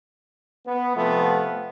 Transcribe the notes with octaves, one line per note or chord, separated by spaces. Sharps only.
B3
C3 F3 A3 B3